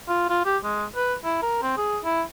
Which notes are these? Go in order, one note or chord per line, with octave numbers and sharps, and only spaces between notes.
F4
F4
G4
G#3
B4
E4
A#4
C4
G#4
E4